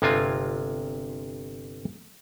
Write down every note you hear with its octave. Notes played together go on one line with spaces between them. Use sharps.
G1 C3 G#3 C4 F4 G#5